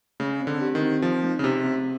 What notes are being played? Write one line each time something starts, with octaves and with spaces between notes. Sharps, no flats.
C#3 A3
C4
D3
G4
D#3
C4
F3 D#4
A3
C#3
C3 G4
C4